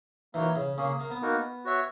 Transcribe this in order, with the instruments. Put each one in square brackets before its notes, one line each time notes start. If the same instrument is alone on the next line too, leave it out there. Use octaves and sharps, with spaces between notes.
[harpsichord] E3 [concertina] A#3 D#4 F#4 A#4 C#5
[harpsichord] C#3
[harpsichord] C#3 [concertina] A#3 C#4 G#4
[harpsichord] A#3
B3
[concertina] A#3 D#4 F#4 A#4
F#4 C#5 E5